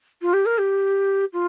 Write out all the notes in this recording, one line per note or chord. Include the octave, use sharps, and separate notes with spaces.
F4
G4
A#4
G4
F4